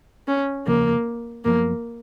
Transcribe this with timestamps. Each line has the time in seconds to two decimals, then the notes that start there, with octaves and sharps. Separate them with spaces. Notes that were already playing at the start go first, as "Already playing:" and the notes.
0.28 C#4
0.67 F1 D#2 C#3 F3 A#3
1.44 F#2 F3 A#3 B3